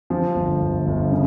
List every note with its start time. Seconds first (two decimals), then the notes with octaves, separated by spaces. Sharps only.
0.10 F3
0.35 G1
0.61 G1
0.87 G1
1.11 C#3